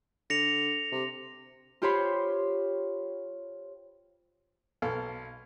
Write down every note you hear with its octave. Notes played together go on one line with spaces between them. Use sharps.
D3 A#6 C#7 F7
C3
F4 G4 C5 C#5 B5 C6
B1 A4 F5